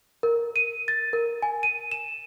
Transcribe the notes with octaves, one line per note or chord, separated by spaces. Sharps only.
A#4
D#7
A6
A#4
G#5
D#7
E7